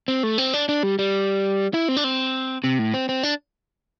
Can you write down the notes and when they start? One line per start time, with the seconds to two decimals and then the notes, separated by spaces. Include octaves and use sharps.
0.08 C4
0.23 A3
0.38 C4
0.53 D4
0.69 D4
0.83 G3
0.99 G3
1.74 E4
1.88 C4
1.97 D4
2.04 C4
2.64 C3
2.79 A2
2.94 C4
3.09 C4
3.23 D4